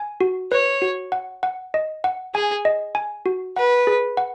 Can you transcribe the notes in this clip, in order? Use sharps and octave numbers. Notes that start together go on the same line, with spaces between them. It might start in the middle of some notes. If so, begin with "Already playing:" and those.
Already playing: G#5
F#4
B4 C#5
F#4
F#5
F#5
D#5
F#5
G#4 G#5
D#5
G#5
F#4
B4 F#5
G#4
F#5